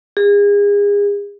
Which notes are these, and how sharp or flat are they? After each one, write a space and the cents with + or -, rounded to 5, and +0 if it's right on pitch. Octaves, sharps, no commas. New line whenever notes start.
G#4 -35